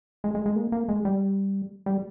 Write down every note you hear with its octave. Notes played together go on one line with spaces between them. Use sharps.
G#3
G#3
G#3
A#3
A#3
G#3
G3
G3